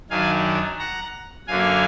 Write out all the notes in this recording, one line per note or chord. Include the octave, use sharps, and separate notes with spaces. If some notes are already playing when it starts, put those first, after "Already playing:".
F#2 D#3 F#3 D4 F5 G#5
F#5 A#5
F#2 D3 F#3 A#3 F5 G#5